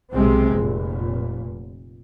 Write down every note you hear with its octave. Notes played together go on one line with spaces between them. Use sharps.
B1 C3 G#3 C4
F1 A#2